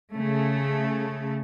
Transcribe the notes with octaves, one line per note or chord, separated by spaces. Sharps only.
C#3 A3